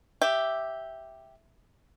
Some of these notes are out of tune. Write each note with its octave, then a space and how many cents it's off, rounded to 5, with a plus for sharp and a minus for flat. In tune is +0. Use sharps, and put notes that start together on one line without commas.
G4 +0 E5 +0